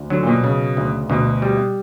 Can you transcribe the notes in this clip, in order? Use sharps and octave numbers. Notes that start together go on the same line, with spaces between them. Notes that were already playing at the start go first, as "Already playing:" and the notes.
Already playing: D2
D3 F#3
A#2
B2
C#3
D2
D2 B2
G3